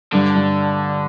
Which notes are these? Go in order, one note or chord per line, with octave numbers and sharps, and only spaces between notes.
G2 D3
G2